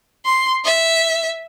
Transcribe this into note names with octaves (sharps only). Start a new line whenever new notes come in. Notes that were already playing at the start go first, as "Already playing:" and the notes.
C6
E5